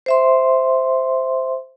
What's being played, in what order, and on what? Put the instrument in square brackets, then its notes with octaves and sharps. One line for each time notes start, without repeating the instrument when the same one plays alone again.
[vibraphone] C5 E5 C6